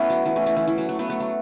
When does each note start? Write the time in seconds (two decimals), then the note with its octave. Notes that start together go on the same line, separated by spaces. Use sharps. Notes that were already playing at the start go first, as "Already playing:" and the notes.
Already playing: A3 B3 C#4 E4
0.10 F#3
0.25 E3
0.36 A3 C#4
0.46 A3 C#4
0.56 E3
0.67 E3
0.78 F#3
0.89 A3
0.99 F#3 B3
1.10 A3
1.20 F#3